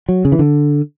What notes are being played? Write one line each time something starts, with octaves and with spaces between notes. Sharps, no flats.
F#3
C#3
E3
D3